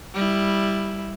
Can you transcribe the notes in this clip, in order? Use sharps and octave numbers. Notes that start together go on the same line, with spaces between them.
G3 E4